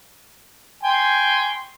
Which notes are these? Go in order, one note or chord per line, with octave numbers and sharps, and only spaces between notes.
G5 G#5 C6